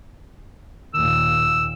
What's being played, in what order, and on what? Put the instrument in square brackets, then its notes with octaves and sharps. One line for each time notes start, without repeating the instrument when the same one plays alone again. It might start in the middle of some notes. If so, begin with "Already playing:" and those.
[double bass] D#2 A#2 [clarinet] E6